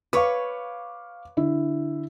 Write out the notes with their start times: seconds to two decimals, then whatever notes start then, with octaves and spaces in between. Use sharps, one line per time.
0.13 B4 C#5 F5 C#6 D6
1.37 D3 E4